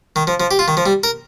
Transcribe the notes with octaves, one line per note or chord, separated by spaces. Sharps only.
D#3
F3
F3
G4
F4
D#3
F3
G3
A#4